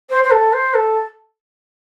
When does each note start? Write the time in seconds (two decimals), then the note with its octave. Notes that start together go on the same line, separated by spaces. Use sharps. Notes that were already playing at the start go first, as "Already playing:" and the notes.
0.10 C5
0.24 C5
0.31 A4
0.53 C5
0.74 A4